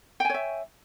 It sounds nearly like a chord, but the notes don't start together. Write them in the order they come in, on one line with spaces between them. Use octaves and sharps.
G5 G#5 C#5 E5